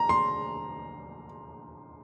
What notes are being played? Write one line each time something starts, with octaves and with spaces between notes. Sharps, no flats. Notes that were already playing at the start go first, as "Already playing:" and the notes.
Already playing: A#5
C6